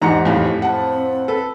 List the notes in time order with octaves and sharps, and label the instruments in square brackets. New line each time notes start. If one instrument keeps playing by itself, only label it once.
[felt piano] E2 G#2 C#7 [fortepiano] D#4 A#5 [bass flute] G4
[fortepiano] F2 A2
[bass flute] C4 [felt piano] F#5 A5
[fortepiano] A4 B4